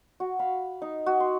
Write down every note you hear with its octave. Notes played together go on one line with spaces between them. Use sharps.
F#4
F5 B5
D#4
F#4
C6